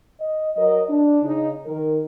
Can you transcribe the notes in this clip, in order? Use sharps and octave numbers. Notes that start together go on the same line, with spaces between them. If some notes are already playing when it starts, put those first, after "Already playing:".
D#5
F#3 A#4 D#5
D4
C#3 D#4
D#3 A#4